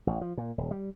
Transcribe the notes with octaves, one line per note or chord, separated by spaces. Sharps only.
A1
F3
A#2
D#1
G3